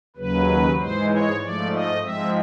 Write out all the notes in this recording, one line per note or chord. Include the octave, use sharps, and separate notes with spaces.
D#2 C#3 F#3 B4
G#2 E3 G#3 C5
C#5
G#2 F3 A3 D5
D#5
G#2 F3 G#3 C4 E5